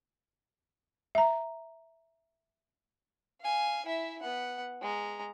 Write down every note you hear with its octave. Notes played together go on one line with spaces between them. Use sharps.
E5 A#5
F5 G#5
E4 E5
B3 F#5
G#3 A#5